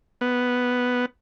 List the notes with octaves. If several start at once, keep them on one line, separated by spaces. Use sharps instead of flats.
B3